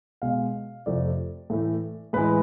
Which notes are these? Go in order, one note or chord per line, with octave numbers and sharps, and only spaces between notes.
B2 G#3 F5
F2 C3 F3 A3 D5
A2 E3 A3
A2 E3 G#3 B4